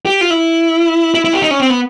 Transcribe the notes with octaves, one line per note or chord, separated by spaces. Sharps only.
G4
F4
E4
E4
E4
G4
D#4
C#4
C4
B3